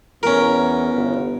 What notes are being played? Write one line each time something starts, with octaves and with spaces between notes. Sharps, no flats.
E2 B3 C#4 A#4
G1